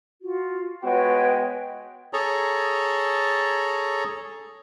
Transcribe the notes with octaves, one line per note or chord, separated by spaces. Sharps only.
F4 F#4
G#3 B3 F#4 B4 C#5 G5
G#4 A4 C#5 A#5